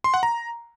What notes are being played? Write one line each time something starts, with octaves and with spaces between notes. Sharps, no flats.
C6
F#5
A#5